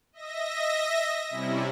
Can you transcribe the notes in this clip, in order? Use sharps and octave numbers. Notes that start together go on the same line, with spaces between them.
D#5 E5 A#6
C3 G3 C#4 E4